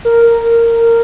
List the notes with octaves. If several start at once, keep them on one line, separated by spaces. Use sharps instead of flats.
A#4